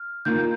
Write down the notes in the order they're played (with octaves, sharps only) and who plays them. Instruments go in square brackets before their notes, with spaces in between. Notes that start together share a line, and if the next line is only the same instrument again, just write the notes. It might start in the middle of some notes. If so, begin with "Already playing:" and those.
Already playing: [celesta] F6
[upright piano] D#3 A#3 F4 [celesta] G6